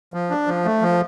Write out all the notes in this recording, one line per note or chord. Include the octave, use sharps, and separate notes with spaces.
F3
D4
F3
A3
F3